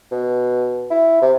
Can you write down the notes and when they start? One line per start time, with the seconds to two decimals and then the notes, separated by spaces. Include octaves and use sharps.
0.12 B2
0.90 E4
1.22 C3